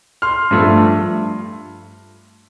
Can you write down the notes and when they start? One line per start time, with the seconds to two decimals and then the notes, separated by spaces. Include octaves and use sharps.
0.22 C6 F6
0.51 G2 F3 A3